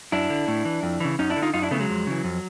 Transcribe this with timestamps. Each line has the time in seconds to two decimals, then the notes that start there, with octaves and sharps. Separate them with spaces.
0.12 F#2 D4 E4
0.30 D3
0.48 A2
0.65 E3
0.83 F2
1.00 C#3 E3
1.19 F#2 C#4 D#4
1.30 D4 E4
1.36 D3
1.42 D#4 F4
1.54 F#2 D#4 F4
1.62 D4 E4
1.71 C#3 A3 B3
1.75 E3
1.80 F#3 G#3
1.89 F2
2.07 C#3 E3
2.24 F2